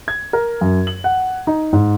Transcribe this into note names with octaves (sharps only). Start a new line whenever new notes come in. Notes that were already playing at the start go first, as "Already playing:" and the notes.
G#6
A#4
F#2
F#7
F#5
D#4
G#2